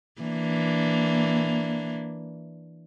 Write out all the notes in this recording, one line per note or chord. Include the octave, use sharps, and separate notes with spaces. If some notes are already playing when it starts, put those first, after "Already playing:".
E3 A#3 D4